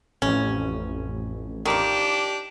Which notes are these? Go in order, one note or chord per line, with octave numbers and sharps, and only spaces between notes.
A1 F2 C#4
D#3 F3 D4 G4